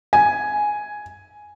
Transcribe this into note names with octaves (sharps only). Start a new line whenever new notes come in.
G#5